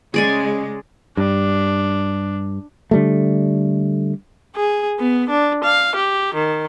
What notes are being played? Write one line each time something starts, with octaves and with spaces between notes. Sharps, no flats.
C#3 G#3 G#4 D5 G#5
G2 D4
D3 G3 A3
G#4
B3
D4
F5
G4
D#3